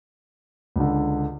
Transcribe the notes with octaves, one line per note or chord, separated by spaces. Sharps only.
C#2 D3